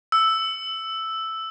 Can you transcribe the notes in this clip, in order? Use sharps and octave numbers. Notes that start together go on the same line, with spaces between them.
E6